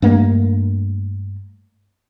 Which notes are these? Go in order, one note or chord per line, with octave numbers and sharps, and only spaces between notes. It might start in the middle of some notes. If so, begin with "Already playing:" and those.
G2 A3 A#3